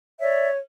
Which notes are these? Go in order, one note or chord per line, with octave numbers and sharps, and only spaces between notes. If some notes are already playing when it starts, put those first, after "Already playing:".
C#5 D5 E5